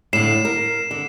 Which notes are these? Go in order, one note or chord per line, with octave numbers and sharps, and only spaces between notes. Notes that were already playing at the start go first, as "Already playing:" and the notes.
A2 D3 C7 E7
A#4
D3